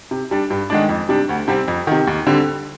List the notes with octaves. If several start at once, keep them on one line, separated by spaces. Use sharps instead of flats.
C3
G3 D4
G2
D#3 G#3 D4
F2
C3 G3 D4
D2
C3 G3 C4
F2
C3 D#3
D#2
D3 G3 C4